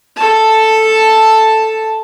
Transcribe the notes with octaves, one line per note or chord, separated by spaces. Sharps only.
A4 A5